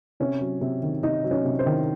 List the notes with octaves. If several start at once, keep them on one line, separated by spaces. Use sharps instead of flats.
C3 C#4
F#3
C3
D#3
C3 D#4
F#3
C#4
C3
C5
D#3